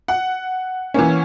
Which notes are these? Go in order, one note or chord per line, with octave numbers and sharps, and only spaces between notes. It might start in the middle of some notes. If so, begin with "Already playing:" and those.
F#5
E3 A#3 C#4